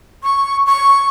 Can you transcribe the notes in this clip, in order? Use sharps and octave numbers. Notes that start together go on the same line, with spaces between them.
C#6
C#6